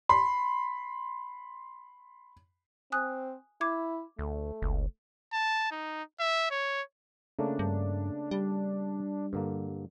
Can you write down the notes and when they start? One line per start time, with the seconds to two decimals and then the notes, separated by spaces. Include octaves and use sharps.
0.09 B5 C6
2.92 C4 G#5 D#6 F#6
3.61 E4 D6 G#6
4.19 D2 A3
4.62 F#1 C#2
5.33 A5
5.71 D#4
6.20 E5
6.51 C#5
7.39 C#3 A3 A#3 D4
7.59 G2
8.31 G3 D4
9.33 G2 D3 A#3